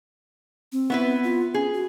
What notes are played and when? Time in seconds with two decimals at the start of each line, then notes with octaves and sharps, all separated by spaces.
0.72 C4
0.90 B3 E4 B4
1.23 F4
1.54 C#4 G#4
1.74 F#4